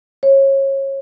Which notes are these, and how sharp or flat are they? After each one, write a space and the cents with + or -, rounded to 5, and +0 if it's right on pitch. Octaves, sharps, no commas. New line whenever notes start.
C#5 -30